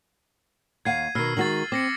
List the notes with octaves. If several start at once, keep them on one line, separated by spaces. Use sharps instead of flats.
D#2 F5 F#5 G#6 C7 D#7
B2 D#3 E6 F6 C7
D#3 G#3 F#4 A6 C7 F#7
C4 D6 A#6 C#7